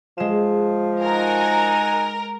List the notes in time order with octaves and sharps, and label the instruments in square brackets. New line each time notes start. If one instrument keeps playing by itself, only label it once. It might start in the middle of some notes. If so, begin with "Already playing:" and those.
[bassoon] F3 [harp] G#3 E7
[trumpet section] D#4 F#4 G#5 [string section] A#4